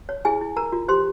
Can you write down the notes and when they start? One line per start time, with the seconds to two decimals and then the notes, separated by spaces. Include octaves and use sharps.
0.09 C#5
0.25 E4 G#4 G#5
0.41 E4
0.57 A#4 A#5
0.72 F4
0.88 G4 C5 C6